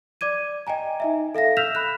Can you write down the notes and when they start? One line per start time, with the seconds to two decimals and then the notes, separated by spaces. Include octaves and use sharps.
0.21 D5 D6 G#6 D#7
0.67 D#5 G5 G#5 A#5
1.00 D#4 D#5 E5
1.35 A4 E5 F5 A#6
1.57 E6 F6 G6 B6 E7 F7
1.75 B5 F#6